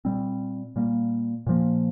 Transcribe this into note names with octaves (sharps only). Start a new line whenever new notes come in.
A#2 G3 C4
A#2 G3 A#3
A#2 F3 A#3